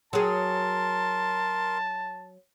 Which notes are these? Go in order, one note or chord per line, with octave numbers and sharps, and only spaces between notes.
F#3 G#4 A#4 A5 C6